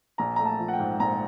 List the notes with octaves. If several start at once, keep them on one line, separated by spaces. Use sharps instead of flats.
A#1 A#5
A3 A#5
A5
F3
F#5
G5
G#2
A#1 A#5